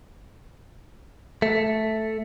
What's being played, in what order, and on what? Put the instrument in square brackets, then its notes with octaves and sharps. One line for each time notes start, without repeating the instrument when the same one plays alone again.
[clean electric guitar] A3